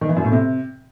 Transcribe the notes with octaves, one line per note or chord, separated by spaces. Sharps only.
D#3
E3
F#2
A2
C3